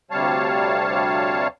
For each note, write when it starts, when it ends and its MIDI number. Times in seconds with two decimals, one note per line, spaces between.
0.11 1.47 38
0.11 1.47 48
0.11 1.47 55
0.11 1.47 73
0.11 1.47 77
0.11 1.47 81